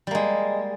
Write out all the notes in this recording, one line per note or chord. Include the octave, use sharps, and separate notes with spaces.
G3 G#3 A#3